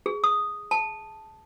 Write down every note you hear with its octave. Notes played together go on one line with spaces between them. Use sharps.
G#4
D#6
A5